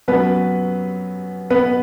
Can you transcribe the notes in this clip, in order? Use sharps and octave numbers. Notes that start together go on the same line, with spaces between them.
F#2 F#3 B3 B4
B3 B4